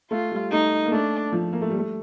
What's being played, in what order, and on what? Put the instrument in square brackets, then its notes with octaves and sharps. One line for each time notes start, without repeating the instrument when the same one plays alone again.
[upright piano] A3 [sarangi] F4
[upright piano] G3
[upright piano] A3 [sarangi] D#4
[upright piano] A#3
[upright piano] A3 [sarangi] D4
[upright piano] F3
A#3
A3
G3
A3